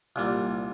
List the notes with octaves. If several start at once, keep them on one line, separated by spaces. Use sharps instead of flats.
C2 A#2 G3